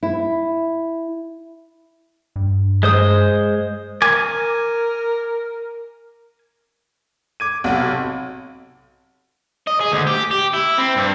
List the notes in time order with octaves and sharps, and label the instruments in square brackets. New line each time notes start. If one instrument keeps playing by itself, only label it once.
[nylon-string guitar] E4
[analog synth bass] G2
[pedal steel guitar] G#3 C5 D#6
[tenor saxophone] A#4 [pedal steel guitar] G#5 D6
[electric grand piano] D6 G#6 D#7
[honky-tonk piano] B1 C3 [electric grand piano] F#5 D#7
[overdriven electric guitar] D#5
G#4
D2
G4
G4
E4
C4
G2